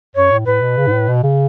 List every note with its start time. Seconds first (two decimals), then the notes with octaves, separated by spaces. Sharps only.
0.15 F#2 C#5
0.32 A2
0.46 A2 B4
0.61 B2
0.77 C#3
0.87 G#2
0.92 A2
1.08 B2
1.23 C#3